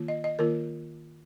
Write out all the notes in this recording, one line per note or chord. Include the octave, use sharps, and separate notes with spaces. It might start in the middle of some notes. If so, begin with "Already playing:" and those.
Already playing: D#3 A#3 F4
D#5
D#5
D#3 A#3 F4 A#4